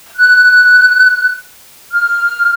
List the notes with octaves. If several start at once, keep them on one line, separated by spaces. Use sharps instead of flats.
F#6
F6